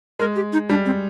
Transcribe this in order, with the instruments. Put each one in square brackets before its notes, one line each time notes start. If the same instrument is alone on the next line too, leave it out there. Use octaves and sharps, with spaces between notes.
[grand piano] G#3 [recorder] A#4
[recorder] G4
D#4
[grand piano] G3 [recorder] D4
[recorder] C4